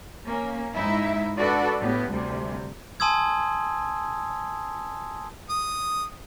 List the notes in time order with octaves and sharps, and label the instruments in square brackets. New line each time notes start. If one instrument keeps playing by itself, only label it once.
[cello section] A#3 C#4
G#2 D#4 E4 E5
D4 F#4 A4 B4 D5
A2 B3 G4
D2 C3 G3
[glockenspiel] G#5 A5 C6 D#6 E6 G#6
[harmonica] D#6